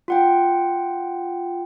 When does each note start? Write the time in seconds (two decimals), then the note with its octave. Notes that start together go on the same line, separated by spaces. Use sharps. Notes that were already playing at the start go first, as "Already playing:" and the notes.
0.08 F4 F#5 G5